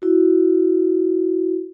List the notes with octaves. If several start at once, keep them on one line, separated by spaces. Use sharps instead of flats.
E4 F#4